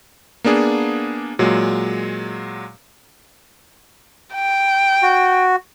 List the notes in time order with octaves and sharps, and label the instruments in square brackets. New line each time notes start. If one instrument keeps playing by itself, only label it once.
[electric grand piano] A#3 B3 D4 G#4
A#2 F#3 G#3
[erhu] G5
[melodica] F#4